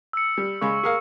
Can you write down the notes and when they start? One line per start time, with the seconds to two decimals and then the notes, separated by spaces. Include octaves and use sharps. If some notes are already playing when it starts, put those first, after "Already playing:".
0.13 E6 C#7
0.38 G3
0.61 C#3 G#3 B5 C#6
0.83 G#4 A#4 F5